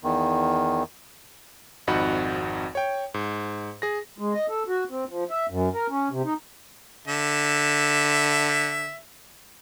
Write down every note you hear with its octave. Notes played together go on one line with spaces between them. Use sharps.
E2 D#3
G#1 F2 D#4 F#4 F#5 B5
C#5 G5
G#2
G#4 A#6
G#3
D#5
A4
F#4
C4
F3
E5
F#2
A#4
C#4
C3
D#4
D3 E5